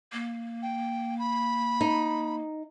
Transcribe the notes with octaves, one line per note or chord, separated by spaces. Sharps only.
A#3
G5
B5
D#4